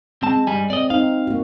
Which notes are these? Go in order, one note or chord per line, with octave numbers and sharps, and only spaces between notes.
G#3 C4 A5
G2 G3 G#5
C4 D5 D#5
C4 D#4 F5
A#3 F#4